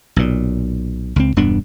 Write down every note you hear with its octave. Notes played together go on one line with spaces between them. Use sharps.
B1 A#2
C#2 C4
E1 G2 B3 D4